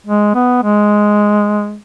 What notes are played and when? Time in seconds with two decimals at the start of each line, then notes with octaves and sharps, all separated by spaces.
0.06 G#3
0.34 B3
0.63 G#3